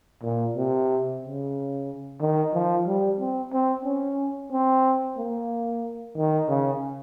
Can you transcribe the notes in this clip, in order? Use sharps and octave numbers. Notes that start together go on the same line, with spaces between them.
A#2
C3
C#3
D#3
F3
G3
C4
C4
C#4
C4
A#3
D#3
C#3